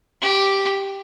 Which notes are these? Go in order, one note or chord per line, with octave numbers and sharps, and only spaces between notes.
G4